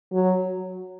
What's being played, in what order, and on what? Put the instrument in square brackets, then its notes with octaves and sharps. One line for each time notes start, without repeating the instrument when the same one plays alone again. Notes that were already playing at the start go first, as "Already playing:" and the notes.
[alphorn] F#3